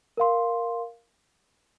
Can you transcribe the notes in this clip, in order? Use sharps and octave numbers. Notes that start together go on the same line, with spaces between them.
A#4 F5 C6